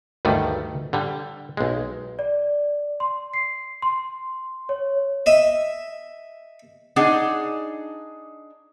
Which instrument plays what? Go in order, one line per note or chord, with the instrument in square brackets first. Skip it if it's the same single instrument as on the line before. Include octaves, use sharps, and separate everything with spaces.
[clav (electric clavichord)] D2 G2 D#3 G3 A3
D3 G3
B1 G#3
[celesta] D5
C6
C7
C6
C#5
[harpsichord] D#5 E5
[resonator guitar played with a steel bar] D4 D#4 G#4 F#5